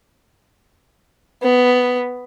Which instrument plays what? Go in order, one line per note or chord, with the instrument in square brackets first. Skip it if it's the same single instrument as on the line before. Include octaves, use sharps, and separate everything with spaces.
[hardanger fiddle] B3